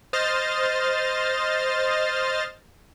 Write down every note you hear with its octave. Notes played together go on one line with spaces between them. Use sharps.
C5 D#5 F6 A6